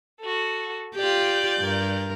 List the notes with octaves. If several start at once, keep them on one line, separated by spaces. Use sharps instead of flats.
F#4 A4
F4 G4 D5 G6
G2 A#4